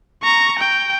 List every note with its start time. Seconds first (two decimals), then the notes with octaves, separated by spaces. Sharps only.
0.23 A#5 C#6
0.59 G5